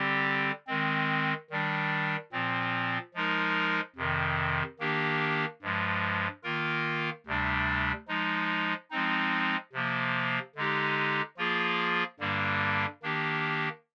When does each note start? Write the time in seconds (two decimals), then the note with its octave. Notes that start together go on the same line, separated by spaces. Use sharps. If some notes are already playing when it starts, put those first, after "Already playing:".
Already playing: D3 G3 C4 G4
0.67 D#3 G#3 C4
1.50 D#3 G3 D4
2.32 A#2 F3 C4
3.14 F3 G#3 D#4 A#4
3.96 F2 C3 D#3
4.79 D#3 A#3 D4 G4
5.62 G2 F3 G#3
6.43 D#3 A#3 F4 A#4
7.26 D2 C3 G3 D4
8.08 F3 G#3 D#4
8.91 F3 G#3 C4 D#4
9.73 C3 F3 A#3
10.55 D3 G#3 D#4 G4
11.37 F3 A#3 F4 G#4
12.20 G2 D3 G3 A#3 D4
13.03 D#3 A#3 D4 G4